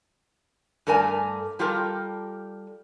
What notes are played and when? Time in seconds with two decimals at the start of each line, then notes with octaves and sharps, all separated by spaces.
0.87 G2 A3 A#4 D5 G#5
1.59 G3 F4 G4 A4 A#4